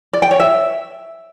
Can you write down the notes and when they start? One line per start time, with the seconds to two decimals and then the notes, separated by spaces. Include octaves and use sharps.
0.13 D5
0.22 G5
0.31 C#5
0.40 E5